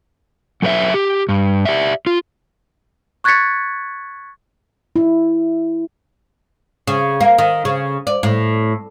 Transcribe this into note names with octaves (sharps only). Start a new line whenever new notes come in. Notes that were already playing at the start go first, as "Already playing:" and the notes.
F#3 A4 B4 C#5 E5
G4
G2
G4 D5 E5
F4
C#6 F#6 G#6 A6 B6 C#7
E4
C#3
A#3
D#3
C#3
D5
A2